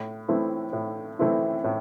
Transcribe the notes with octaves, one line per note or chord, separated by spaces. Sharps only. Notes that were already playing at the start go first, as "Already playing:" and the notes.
Already playing: A2
E3 A3 C4 E4
A2
E3 A3 C4 E4
A2